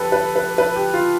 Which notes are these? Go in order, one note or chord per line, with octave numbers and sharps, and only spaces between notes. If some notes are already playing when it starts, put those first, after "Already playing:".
Already playing: F2 D3 F3 G4 A4 B4
B4
B4
B4
G4
F4